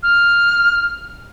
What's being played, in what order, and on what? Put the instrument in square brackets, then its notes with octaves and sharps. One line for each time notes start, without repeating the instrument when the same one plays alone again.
[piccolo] F6